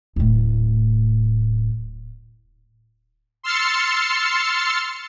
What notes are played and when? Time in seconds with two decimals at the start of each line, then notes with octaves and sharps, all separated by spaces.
0.16 D1 A2
3.43 C6 E6 F6 A6 C7 C#7